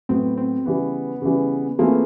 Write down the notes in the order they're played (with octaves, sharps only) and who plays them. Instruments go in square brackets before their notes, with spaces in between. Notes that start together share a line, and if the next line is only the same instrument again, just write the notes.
[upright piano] A2 F#3 B3 [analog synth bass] C4
[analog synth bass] C4
[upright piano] C#3 E3 G3 [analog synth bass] B3
[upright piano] C#3 E3 G3
[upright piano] E3 A3 C4 F4 G#4 [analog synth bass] A#3